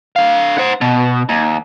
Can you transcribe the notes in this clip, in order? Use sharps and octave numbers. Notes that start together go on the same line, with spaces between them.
D3 F5
C5 F#5
B2
D#2